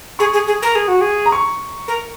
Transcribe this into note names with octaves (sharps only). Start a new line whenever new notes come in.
G#4 C#6
G#4
G#4
A#4
G#4
F#4
G#4
A#5
C#6
A#4